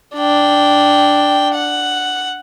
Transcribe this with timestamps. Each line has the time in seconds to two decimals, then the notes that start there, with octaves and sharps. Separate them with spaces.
0.16 D4 G5
1.54 F#5